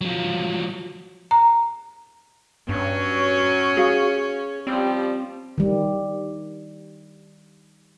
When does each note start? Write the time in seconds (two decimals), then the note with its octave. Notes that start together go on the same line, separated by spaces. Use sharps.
0.01 F3 F#3
1.31 A#5
2.69 G2 F#3 C#4
3.77 F#4 G#4 F5
4.67 F3 G3 C4
5.58 D#3 G3